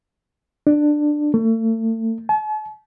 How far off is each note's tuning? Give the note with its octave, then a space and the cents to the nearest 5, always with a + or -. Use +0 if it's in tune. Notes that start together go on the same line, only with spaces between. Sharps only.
D4 +15
A3 +35
A5 -45